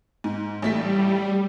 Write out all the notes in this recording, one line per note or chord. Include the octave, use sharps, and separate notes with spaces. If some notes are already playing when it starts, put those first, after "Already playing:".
G#2
A1 G3 A3 B6